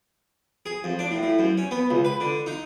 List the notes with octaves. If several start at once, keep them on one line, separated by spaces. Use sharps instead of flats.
G#4
F2
D4
A2
A2
F#2
C#4
B3
C#2
B4
D3
D#4